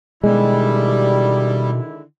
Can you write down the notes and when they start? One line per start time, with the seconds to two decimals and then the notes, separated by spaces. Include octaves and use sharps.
0.24 B2 D3 D#3 G3 G#3 E4